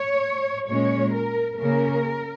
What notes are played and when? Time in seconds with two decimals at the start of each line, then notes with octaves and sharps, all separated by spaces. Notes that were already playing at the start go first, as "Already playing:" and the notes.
Already playing: C#5
0.67 A#2 G#3 C#4 C#5
1.14 A#4
1.60 C#3 A#3 C#4 A#4